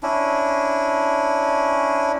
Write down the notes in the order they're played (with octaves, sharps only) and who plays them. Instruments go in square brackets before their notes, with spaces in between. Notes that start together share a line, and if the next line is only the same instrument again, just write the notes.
[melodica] C#4 D4 E4